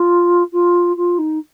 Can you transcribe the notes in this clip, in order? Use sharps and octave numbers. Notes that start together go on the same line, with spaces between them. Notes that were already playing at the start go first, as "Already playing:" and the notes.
Already playing: F4
F4
F4
D#4